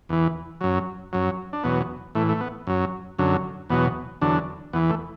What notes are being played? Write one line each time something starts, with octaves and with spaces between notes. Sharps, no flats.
E2 E3
F#2 F#3
F#2 F#3
D4
E2 B2 F#3 B3
A2 E3 A3
A3
B3
F#2 F#3
F#2 D3 F#3
E2 B2 F#3 B3
E2 D3 F#3 D4
E2 E3 B3
A3